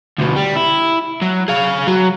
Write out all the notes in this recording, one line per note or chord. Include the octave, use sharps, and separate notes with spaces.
D2 B2
G3
E4
F#3
G#4 F5
F#3